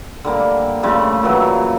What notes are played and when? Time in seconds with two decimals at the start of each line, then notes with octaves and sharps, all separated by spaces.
0.25 D3 G3 A#3
0.83 C#3 F3 G3 A3
1.23 A#2 E3 F#3